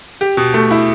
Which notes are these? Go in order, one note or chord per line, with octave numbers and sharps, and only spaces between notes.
G4
B2
A3
E4